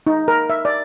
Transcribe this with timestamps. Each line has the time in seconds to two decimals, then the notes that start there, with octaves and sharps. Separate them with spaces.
0.07 D#4
0.28 A#4
0.50 E5
0.65 D5